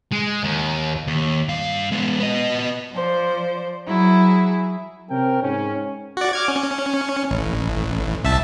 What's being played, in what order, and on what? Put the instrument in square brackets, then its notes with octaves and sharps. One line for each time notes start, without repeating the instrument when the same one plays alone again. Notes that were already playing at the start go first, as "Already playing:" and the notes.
[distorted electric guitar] G#3
D#2
[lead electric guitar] D#2
G2 F5
G#3 B3
B3 D#5
[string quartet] F3 C5 D5
F#3 E4 G#4
[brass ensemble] C3 C4 C#4 A#4 G5
G#2 C#4
[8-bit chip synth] F#4 D5
D6 F6 G#6
C#4
A1
C2 E5 A5